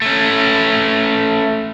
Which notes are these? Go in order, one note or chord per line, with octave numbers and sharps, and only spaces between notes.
A3 C#4